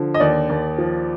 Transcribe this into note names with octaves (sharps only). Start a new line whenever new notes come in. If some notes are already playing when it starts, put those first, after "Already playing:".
Already playing: D3 F3
D#5
D#2 D5
D#2
F3